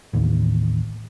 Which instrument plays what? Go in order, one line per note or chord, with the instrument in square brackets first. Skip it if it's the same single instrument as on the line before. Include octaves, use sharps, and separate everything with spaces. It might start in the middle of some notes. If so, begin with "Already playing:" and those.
[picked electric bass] A1 D#2